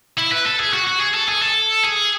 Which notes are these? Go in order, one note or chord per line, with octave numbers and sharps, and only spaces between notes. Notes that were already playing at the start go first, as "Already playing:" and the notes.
E4
B4
A4
G#4
F#4
F#4
G#4
A4
G#4
A4
G#4